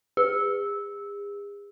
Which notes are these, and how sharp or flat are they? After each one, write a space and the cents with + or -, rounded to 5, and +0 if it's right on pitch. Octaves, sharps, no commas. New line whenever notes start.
G#4 -40